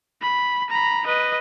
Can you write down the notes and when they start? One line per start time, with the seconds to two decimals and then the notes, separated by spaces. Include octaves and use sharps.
0.22 B5
0.70 A#5 B5
1.06 B4 D#5